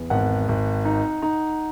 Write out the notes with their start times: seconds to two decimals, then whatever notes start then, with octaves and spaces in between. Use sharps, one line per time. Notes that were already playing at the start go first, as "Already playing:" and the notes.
Already playing: E2
0.10 G#1 F#5
0.49 G#1
0.85 D#4
1.22 D#4